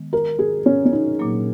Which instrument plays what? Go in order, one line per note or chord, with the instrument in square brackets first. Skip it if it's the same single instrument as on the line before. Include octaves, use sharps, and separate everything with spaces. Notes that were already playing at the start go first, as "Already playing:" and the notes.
Already playing: [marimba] D#3 G#3 B3
[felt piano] A#4
G#4
C#4
C#4
D#4
[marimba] A#2 F#3 A#3